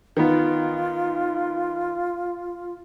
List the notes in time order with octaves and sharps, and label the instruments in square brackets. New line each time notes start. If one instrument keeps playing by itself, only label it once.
[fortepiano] D#3 B3 [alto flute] F4